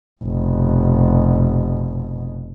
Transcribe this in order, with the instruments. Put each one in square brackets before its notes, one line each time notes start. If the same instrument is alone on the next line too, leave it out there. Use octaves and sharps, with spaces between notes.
[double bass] F1 B2